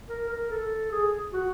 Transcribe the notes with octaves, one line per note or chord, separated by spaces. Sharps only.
A#4
A#4
A4
G#4
F#4